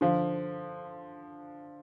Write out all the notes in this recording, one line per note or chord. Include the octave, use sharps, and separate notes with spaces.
D3 F3